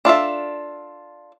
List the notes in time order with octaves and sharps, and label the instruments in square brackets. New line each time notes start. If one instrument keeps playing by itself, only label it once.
[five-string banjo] D4 F4 A4 E5